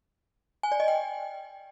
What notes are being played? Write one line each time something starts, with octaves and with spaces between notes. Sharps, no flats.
G#5
D5
D#5
G5